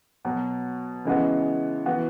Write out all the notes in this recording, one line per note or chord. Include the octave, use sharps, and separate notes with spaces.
B2 F#3 B3 F#4
C#3 E3 G#3 B3 F#4
E3 B3 F#4